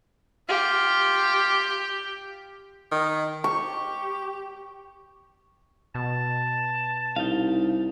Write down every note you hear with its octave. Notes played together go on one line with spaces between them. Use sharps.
F4 G4 F5
D#3
G4 C#6
B2 A5
C2 D#4 F5